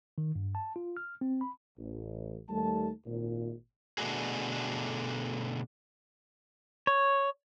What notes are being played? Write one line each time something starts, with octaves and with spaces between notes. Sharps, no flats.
D#3
G2
A5
F4
F6
C4
B5
A1
D#2 G3 A3 A5
G#1 A#2
B2 D3 A3 D4 F#4 G#4
C#5